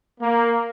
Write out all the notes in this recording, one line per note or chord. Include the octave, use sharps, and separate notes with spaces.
A#3